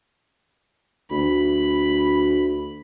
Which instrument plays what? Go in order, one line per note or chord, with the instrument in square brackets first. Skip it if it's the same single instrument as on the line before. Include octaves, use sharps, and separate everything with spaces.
[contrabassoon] D2 [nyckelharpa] B5